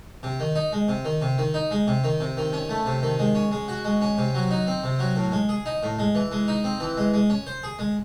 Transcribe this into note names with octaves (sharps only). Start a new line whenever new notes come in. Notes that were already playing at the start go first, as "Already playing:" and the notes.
C3
D#3
D#4
G#3
C3
D#3
C3
D#3
D#4
G#3
C3
D#3
C3
D#3
C#4
A3
C3
D#3
G#3
C#4
G#3
F#4
G#3
C#4
C3
F#3
D#4
C4
C3
F#3
A2
G#3
G#4
D#4
A2
G#3
E3
G#3
D#4
C4
E3
G#3
G#3
C#4
C5
G#4
G#3